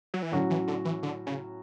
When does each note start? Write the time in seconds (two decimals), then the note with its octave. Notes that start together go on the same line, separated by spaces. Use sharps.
0.14 F#3
0.22 E3
0.32 A2 D3 F#3 C#4 F#4
0.50 E3
0.68 D3
0.85 E3
1.03 D3
1.26 C#3